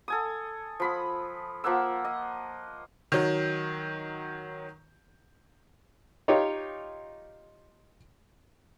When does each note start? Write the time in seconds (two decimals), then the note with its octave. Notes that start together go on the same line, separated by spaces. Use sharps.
0.08 A4 G#5 D#6
0.80 F3 B5 D#6
1.64 F3 A#3 F#5 E6
2.05 D#5
3.12 D#3 F#3
6.28 D#4 F4 G4 C#5